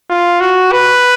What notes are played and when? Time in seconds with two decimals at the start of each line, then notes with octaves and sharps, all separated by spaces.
0.10 F4
0.41 F#4
0.72 B4